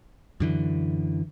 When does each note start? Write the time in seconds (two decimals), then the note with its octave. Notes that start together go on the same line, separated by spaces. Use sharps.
0.40 F#2 D3 E3